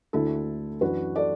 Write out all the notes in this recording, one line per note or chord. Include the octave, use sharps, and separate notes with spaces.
D2 D3 A3 E4 A4
F#2 E3 D4 F#4 B4
A4 D5